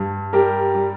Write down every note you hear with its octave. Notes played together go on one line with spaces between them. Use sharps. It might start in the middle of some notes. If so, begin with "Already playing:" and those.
Already playing: G2
G3 G4 A#4
G3